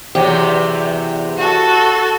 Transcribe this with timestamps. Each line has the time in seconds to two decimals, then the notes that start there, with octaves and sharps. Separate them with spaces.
0.15 E2 C3 F#3 G4
1.38 F#4 A4